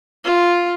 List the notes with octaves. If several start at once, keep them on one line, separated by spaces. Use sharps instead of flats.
F4